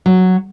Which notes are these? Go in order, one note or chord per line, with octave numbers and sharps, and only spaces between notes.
F#3